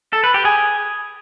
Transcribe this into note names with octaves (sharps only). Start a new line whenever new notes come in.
A4
B4
G4
G#4